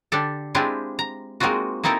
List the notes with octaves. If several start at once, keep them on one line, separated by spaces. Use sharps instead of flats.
D3 D4 G4 A4
G#3 C4 D4 E4 F4 G4
A#5
G#3 A#3 C4 D#4 F4 F#4
A#3 C4 D#4 E4 A4 A#4